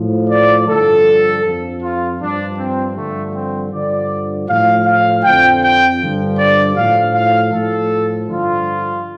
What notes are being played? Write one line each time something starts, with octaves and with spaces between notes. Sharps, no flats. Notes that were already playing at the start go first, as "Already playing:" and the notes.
Already playing: A2 F3
D5
G2 D3 F3 A4
F2 F3
F4
G2 F3 D4
C4
G2 D3 F3 A3
C4
G2 D3 F3 D5
A2 F3 F5
F5
F2 D3 F3 G5
G5
G2 D3 F3
D5
A2 F3 F5
F5
A2 F3 A4
G2 D3 F3 F4